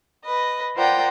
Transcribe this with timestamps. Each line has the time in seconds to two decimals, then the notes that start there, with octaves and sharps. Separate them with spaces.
0.24 B4 D#5
0.75 F4 A#4 C5 D5 F#5 G5